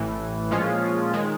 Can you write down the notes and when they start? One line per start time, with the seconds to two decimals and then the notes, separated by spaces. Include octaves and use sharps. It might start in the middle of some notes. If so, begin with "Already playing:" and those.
Already playing: A1 A2 E3
0.51 A#2 F3 G#3 C#4 F4
1.13 D#3 G#3